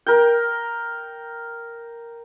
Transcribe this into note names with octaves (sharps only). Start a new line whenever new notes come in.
A#4 G5